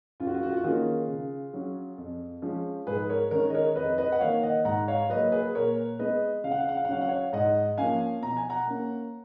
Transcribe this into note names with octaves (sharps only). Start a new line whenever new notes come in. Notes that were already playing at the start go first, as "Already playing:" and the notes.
F#2 F4
F#4
F4
F#4
F4
F#4
D#3 A#3 C#4 F4 G#4
C#3
F#3 C#4
F2
F3 G#3 C#4
G#2 G#4 B4
A#4 C#5
D#3 G#3 C#4 A#4 C#5
D#5
A#4 C#5
F2 B4 D#5
B4 D#5
F#5
D#3 A#3 C#5 F5
D#5 F#5
G#2 F#5 A#5
C#5 F5
F#3 A#3 B4 D#5
G#4 B4
A#2 A#4 C#5
G#3 B3 B4 D#5
C#3 F5
F#5
F5
F#5
F5
F#5
F#3 C#4 F5
F#5
C#5 F5
G#2 D#5 F#5
F3 A#3 C#4 F5 G#5
B2 A#5
G#5
F#5 A#5
A#3 C#4